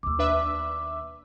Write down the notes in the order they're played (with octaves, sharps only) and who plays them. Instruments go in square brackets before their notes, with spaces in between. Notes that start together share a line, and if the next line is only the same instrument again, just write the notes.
[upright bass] D#2 B2 [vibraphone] D6 E6
[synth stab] D4 B4 E5